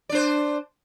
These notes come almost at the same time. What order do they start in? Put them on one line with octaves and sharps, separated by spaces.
D5 D4 C5